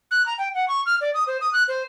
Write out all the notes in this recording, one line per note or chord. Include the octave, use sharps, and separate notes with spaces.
F#6
A#5
G5
F#5
C#6
F6
D5
D#6
C5
D#6
F#6
C5